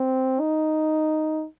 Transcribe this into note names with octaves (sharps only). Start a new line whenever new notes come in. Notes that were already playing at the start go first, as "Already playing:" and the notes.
Already playing: C4
D#4